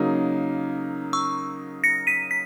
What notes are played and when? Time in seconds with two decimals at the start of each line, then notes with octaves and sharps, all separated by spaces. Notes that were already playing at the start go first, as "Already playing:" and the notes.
Already playing: C#3 F#3 A#3 D#4
1.13 C#6 E6
1.84 A#6 C#7
2.07 B6 D#7
2.31 B6